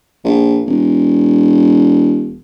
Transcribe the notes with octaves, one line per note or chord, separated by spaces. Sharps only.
A#1
E1